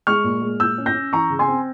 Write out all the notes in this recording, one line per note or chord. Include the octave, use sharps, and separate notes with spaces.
G#3 C#6 F6
A#2
G#3
A#2 E6 G6
C#4
G6 A#6
C#4
E3 A#5 C#6
C#3
G#5 C6
C4